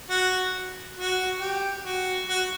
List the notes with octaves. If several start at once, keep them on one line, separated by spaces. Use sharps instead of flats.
F#4
F#4
G4
F#4
F#4